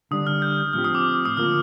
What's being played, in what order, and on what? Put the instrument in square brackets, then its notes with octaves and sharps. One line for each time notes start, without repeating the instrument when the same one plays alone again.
[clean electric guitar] D3 G3 D4 [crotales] D#6
[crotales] F6
G6
[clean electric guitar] A2 F3 C4 G4 [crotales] F6
[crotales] D#6
D6
F6
D#6
[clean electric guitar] D3 F3 A#3 F4 A#4 [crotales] F6